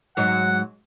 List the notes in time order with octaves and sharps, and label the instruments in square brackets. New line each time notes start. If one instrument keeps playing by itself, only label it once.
[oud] G#2 F#3 [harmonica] F#5